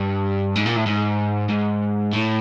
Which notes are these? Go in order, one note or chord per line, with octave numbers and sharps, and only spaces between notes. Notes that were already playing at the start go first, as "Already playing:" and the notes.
Already playing: G2
G#2
A#2
A2
G#2
G#2
A2